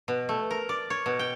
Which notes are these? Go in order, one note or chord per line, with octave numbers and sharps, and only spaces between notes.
B2
A3
A#4
D5
C#5
B2
G5